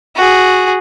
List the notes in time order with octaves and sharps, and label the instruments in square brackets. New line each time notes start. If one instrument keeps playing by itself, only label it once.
[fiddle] F#4 G#4